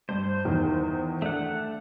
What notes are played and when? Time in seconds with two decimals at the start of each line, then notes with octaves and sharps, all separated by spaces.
0.09 G2 C5
0.45 E2 D#3
1.22 A3 D4 F#5